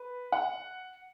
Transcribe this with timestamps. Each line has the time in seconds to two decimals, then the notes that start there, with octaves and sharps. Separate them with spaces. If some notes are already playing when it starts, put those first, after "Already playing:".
Already playing: B4
0.32 F#5